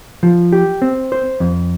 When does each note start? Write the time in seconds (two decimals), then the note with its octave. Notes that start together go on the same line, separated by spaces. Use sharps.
0.23 F3
0.53 G4
0.82 C4
1.12 C5
1.40 F2